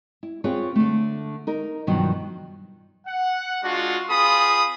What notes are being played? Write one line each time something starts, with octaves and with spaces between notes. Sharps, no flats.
E4
C4 F4 G#4 B4 C#5
D3 A3
D#4 A#4
G2 B2 D#3 F3 F#3
F#5
G#3 D4 F4 F#4
C4 F4 G#4 B5 D#6